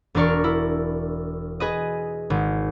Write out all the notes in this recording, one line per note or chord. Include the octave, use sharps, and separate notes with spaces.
E1 D4 A#4 D5 C#6 F6
E4
G#4 B4 D#5
G#1